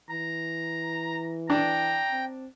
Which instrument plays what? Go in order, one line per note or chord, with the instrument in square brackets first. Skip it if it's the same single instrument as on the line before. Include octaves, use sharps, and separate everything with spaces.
[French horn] E3 [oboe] A#5
[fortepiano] D4 [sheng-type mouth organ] G5 [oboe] A#5
[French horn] C4